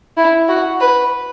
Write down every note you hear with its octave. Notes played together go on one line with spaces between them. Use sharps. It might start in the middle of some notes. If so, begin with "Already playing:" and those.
E4
F#4
B4